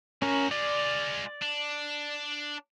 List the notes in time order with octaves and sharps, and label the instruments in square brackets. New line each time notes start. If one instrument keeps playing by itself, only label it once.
[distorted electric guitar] A2 F#4 [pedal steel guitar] C#4 A#4
[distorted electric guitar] G#3 F4 [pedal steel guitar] D5
[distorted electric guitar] D4